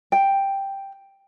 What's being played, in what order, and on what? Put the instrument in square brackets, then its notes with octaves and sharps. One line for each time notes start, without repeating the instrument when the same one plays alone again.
[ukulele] G5